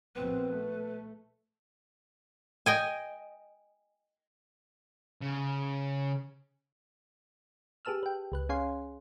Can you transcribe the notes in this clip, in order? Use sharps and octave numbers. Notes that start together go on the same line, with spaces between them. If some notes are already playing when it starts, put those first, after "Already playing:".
A#1 B2 C4 B4
A3
D#5 G5 G#5
C#3
G4 G#4 B4 A5 E6 F6
B4 G5
C#2 B4 F#6
C#4 G#4 C#5 F5 G#5 C6